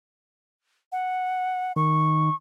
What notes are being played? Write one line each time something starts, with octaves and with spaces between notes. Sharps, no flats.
F#5
D#3 C#6